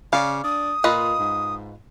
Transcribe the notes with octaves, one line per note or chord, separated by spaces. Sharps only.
C#3 D5 F5
D4 D#6
A#2 F4 B4 D#5
G#2